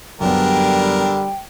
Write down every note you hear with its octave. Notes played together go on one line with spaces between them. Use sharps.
F#2 D3 G3 B3 D4 A#4 G5